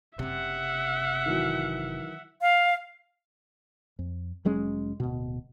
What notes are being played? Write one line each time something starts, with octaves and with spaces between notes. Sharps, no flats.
F#1 C3 E5 F#5
D#3 E3 F#3
F5
F2
F1 F#3 G#3 C#4
D1 B2